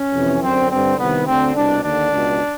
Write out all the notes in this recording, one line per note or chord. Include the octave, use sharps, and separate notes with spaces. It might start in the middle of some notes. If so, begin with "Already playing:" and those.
Already playing: C#4
F2 C3 E3
F#2 D3 C4
G2 D3 C4
C2 C3 D#3 B3
D2 D3 C4
C2 B2 D4
D#2 D3 D4
C#2 B2